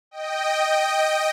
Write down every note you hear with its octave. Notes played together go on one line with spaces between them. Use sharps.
D#5 G5